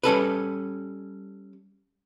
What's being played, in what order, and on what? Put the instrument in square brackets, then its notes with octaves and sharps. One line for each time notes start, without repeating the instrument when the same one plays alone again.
[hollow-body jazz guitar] G3 C#4 A4 B4